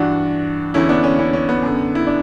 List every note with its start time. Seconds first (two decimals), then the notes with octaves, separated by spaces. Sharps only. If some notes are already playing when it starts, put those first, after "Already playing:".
Already playing: G2 E3 D4 F#4
0.74 E2 D3 C#4 E4
0.89 B3 D4
1.04 C#4
1.19 C#4 E4
1.33 C#4
1.49 B3
1.63 F#2 D3
1.95 E4
2.07 D4